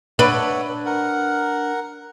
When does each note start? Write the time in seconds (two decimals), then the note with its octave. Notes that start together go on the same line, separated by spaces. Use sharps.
0.19 D4 B4 C#5 E5 F#5
0.86 A#4 F#5